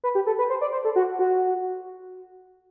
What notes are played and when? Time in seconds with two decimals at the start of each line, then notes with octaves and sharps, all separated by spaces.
0.04 B4
0.15 G4
0.27 A4
0.39 B4
0.50 C5
0.61 D5
0.72 C5
0.84 A4
0.96 F#4
1.19 F#4